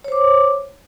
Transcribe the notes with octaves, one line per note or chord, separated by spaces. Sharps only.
C5 C#5 D6